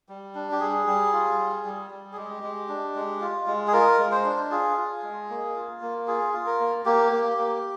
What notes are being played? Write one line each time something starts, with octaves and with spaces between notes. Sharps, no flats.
G3
D4
G4
G3 G#4
G3
F4
G3
G3
G3
G#4
G#3 G4
G#3
D4
G#3
F4
G#3
G#4
F4 A#4
G#3
C5
D4
F4 G#4
F4
G#3
A#3
F4
A#3
F4 G#4
F4
A#4
A#3
A#3 G4
A#3
A#3